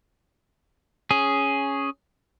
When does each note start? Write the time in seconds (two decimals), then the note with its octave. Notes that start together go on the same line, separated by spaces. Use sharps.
1.11 C#4 G#4